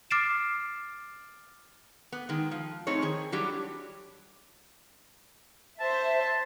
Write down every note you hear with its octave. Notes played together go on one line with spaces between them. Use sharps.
D6 F6 A6 C7 D7 E7
B3
D#3 G#3
F3
A3 C4 D#4 G#4 C#5
D#3 G#4
F#3 G3 D4 E4 G4
C5 E5 A5